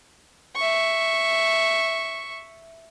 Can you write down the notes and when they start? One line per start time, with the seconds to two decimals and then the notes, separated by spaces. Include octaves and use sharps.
0.56 E5 C#6